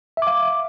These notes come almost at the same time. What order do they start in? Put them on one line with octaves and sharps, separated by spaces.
E5 D6 F5